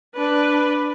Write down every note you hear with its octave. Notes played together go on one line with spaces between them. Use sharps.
D4 B4